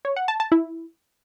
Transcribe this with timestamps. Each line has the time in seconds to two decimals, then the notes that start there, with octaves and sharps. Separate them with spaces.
0.05 C#5
0.16 F#5
0.28 A5
0.40 A5
0.52 E4